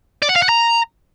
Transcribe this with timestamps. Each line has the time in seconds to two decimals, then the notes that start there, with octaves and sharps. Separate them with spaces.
0.23 D5
0.29 F#5
0.36 F5
0.42 F#5
0.49 A#5